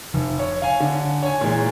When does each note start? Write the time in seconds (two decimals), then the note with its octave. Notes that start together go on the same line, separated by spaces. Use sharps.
0.14 F1
0.39 C#5
0.62 F5 G#5
0.80 D3
1.23 C#5 G#5
1.41 A#2 E3 G#3